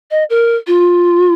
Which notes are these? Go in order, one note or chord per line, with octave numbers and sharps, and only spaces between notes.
D#5
A#4
F4